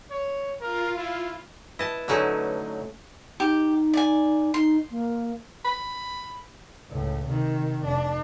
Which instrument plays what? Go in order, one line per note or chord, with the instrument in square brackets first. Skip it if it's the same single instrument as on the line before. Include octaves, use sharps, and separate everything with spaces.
[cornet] C#5
[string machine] F4 [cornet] A#4
[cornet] E4
[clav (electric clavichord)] E4 [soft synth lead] B4 [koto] D#5 A5
[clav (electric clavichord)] D3 F#3 D#4 [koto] A3 C#4 E4
[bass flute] D#4 [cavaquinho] G4
[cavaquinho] D5 G#5
[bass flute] D#4 [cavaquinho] C6
[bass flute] A#3
[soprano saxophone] B5
[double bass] C#2 A2
C3 D#3
F1 D4